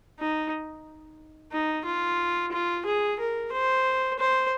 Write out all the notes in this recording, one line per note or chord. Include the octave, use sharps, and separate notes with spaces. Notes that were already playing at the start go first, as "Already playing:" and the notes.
D#4
D#4
F4
F4
G#4
A#4
C5
C5